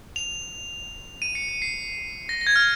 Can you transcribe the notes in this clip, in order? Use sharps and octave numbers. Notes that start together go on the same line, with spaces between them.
F7
D#7
C#7
C#7
C7
A#6
A#6
G#6
F6